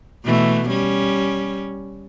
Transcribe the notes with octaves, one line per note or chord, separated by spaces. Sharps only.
B2 E3 A3
G3 C#4